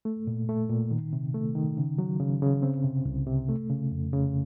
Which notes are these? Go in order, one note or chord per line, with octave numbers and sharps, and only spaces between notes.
A3
A#2
A3
A#2
D#3
C3
A3
D#3
C#3
F#3
C#3
C#3
C4
C3
C2
C3
A3
C#3
F2
C#3